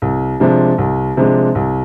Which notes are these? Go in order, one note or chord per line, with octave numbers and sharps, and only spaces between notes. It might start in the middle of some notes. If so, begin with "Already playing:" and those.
C2
C3 F3 G#3 D4
C2
C3 F3 G#3 D4
C2